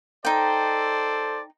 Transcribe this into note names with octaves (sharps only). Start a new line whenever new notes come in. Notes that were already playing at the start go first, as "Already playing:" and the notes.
D#4 A4 C5 D5 G5